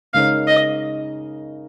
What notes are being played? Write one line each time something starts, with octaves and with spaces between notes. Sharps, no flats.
C#3 G#3 D#4 A#4 C#5 F5
D#5